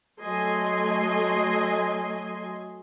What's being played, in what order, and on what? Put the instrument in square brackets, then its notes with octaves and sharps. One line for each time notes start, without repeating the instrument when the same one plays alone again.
[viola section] F#3 A3 D#5 G#5 C6